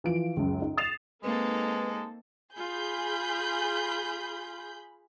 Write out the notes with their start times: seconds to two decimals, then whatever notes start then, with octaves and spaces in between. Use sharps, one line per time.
0.04 E3 F3 D7
0.37 C#2 F#2
0.62 D#4
0.77 D#6 A6 C7 E7 F7
1.24 G#3 A#3 C4 D#4 A4 B4
2.56 F4 G#4 B5 G6